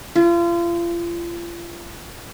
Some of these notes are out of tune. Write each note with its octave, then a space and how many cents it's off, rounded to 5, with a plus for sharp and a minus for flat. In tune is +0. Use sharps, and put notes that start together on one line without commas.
F4 -35